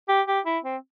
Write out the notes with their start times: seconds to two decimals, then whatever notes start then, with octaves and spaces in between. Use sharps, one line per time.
0.09 G4
0.27 G4
0.46 E4
0.64 C4